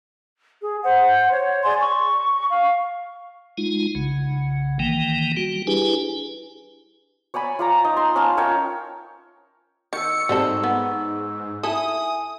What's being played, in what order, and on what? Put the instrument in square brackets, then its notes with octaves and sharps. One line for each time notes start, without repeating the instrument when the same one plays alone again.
[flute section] G#4
C5 F#5
C#5
G#4 D5 G#5 C6
C#6
F5
[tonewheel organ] G#3 D#4 F4
B1 C#3
D#3 E3 A#3 G5
G3 F#4
D4 E4 G4 G#4 B4 G#5
[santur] C#5 D5 G#5 B5
F4 D5 A#5
D#4
C6
C#4 F5 A5
A#4 C#5 F5 G5
[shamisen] D#3 [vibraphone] C#6 E6 [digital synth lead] C#7
[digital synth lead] G#2 [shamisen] G3 C4 A4
[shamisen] B3
[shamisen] E4 A4 [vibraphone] E5 G#5 [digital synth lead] D#6